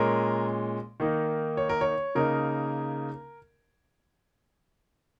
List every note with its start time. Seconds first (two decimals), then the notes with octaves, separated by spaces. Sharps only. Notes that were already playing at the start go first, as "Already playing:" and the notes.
Already playing: A#2 G#3 C#4 A#4
1.00 D#3 A#3 D#4
1.57 C#5
1.69 A#4
1.81 C#5
2.15 C#3 A#3 D#4 A#4